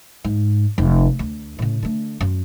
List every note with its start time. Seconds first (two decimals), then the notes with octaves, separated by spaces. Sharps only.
0.24 G#2
0.78 F1
1.19 D2
1.59 A2 C#3
1.83 D3 A3
2.21 F#2